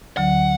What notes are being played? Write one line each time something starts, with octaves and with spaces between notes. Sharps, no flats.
D2 D3 F#3 F#5